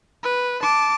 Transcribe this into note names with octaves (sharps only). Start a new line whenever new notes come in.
B4
A5 D6